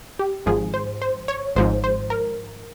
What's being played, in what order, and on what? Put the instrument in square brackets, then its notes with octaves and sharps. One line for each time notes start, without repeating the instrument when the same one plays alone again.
[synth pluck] G4
G#1 G#2 F3 G#4
C5
C5
C#5
G#1 G#2 F3 C5
C5
A#4